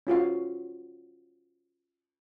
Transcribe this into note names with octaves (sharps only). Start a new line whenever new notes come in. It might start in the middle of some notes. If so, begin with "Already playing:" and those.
C#4 F4 F#4 F5